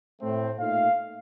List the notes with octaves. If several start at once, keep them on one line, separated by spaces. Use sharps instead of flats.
A2 A3 C4
A#2 A3 D#4 F5